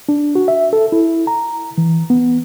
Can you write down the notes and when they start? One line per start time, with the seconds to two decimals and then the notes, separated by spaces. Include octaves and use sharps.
0.09 D4
0.35 F#4
0.48 E5
0.73 A4
0.92 E4
1.27 A#5
1.78 E3
2.10 B3